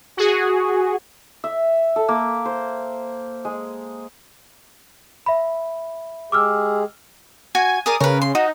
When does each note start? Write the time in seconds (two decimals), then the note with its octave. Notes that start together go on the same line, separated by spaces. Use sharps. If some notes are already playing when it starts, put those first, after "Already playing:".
0.17 F#4 G#4
1.44 E5
1.96 A4
2.09 A#3
2.45 C5
3.45 G#3
5.26 E5 B5
6.32 G#3 G4 G#4 D6 E6 F6
7.55 F#4 G#5
7.86 G#4 A#4 D5 D#6
8.00 C#3 A#4 B4
8.21 C6
8.35 D#4 F#4